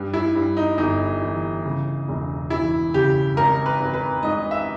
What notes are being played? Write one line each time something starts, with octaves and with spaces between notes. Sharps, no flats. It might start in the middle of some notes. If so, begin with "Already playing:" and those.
Already playing: G2
E4
G2
D#4
G1 D#4
E3
C#3
E1
E3 E4
C#3 G4
G#1 A#4
B4
G#1
B4
G#2 D#5
E5